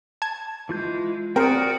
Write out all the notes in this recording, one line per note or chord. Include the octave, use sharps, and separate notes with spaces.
A5 G#6
E3 G#3 F4 G6
C4 F#4 A#4 C5 D5 G5 D#6